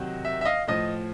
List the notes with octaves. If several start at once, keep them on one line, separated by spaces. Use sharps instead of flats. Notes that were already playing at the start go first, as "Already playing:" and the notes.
Already playing: C3 D#3 F#3
E5
E5
D#5 F5
A2 F3 D#5